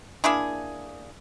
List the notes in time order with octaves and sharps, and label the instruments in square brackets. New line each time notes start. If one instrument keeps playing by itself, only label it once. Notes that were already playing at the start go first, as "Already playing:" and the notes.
[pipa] A#3 D4 E4 G#4